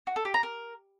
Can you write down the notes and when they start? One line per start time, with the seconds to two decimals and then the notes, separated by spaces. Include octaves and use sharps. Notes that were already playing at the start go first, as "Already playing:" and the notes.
0.07 F#4
0.16 A4
0.25 G4
0.34 A#5
0.43 A#4